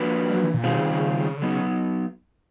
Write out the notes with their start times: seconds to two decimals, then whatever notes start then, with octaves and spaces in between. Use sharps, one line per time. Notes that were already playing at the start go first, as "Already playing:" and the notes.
Already playing: F3 A#3 D4 F#4 B4
0.25 G3
0.34 F#3
0.44 E3
0.54 A#2
0.64 B2 D#3 G3 C4 F4 G#4
0.77 C#3
0.91 C#3
1.37 D3
1.42 C#3 F#3 B3 D#4